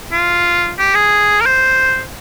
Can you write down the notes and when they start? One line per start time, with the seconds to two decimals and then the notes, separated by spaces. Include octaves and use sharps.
0.12 F4
0.79 G4
0.95 G#4
1.41 A#4
1.46 C5